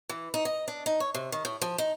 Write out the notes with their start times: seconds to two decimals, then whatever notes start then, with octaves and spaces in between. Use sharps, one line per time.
0.09 E3
0.34 D#4
0.45 D#5
0.68 D4
0.86 D#4
1.00 C#5
1.15 C3
1.32 D#3
1.45 A2
1.62 F3
1.78 D#4